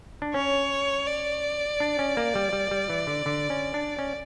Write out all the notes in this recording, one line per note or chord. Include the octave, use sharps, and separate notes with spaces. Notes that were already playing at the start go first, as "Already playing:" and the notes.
D4
C#4 C#5
D5
D4
C#4
A#3
G3
G3
G3
E3
D3
D3
C#4
D4
C#4